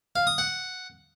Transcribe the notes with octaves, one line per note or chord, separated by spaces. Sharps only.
F5
D#6
F#5